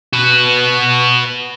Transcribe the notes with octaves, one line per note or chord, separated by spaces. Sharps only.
F#4 B4